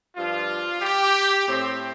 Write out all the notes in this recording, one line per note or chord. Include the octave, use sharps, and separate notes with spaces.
G2 F3 D4 F4
G4
A2 A3 C4